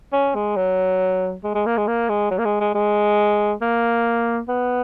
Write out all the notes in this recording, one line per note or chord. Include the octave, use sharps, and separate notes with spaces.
C#4
G#3
F#3
G#3
G#3
A#3
G#3
A#3
G#3
F#3
A#3
G#3
G#3
G#3
A#3
B3